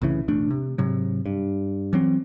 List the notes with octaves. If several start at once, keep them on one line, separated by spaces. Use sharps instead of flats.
C2 A2 C#3 E3
E1 A1 A3 D4
C3
G#2 C3 F#3
G2
E3 F#3 C4